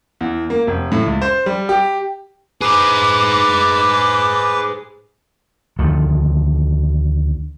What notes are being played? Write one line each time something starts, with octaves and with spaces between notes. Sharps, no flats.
E2
A#3
F1
A2
C#2
C5
G3
G4
G#4 B4 C5 D6
D2 D#3 F3 A3